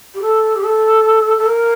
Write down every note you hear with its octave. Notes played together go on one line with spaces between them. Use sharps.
G4
A4
G4
A4
A4
A#4